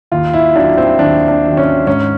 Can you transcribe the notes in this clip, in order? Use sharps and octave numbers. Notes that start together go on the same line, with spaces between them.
D#2 F4
E4
D#3 F#3 D4
C4
D#2 D4
D4
D#3 F#3
C#4
G#2 C#4